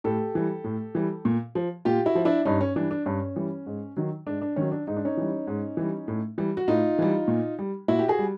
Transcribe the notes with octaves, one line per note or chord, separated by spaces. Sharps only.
A2 G4 A4
E3 G3
A2
E3 G3
A#2
F3
A#2 F4 G4
E4 F#4
F3
D4 E4
G2 C#4 D#4
C#4
E3 G3 D4
D4
G2 C#4
E3 G3
G#2
D#3 F#3
G#2 D4
D4
D#3 F#3 C#4
D4
G#2 D#4
D4
C#4 D#4
E3 G3
G#2
E3 G3
A2
E3 G3
F#4
A2 D#4 F4
E3 G3
A#2
G3
A#2 E4 F#4
G4
F#4 G#4
G3